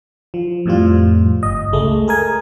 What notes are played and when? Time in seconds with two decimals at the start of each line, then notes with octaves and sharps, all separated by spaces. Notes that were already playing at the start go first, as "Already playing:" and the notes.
0.34 F3
0.66 F2 A2 F3 G3 F4
1.43 G1 D#5
1.72 C#2 G#3 A3
2.08 G#4 A#4 G#5